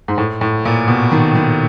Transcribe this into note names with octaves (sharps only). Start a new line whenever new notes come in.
G#2
A2
A2
A#2
B2
D#3
D#3